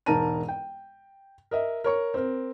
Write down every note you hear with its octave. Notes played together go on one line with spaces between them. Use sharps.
E1 G#2 A#4 A5 A#5 D#7
G5
A#4 D#5 E5
A#4 C#5 C#6
C4 A#4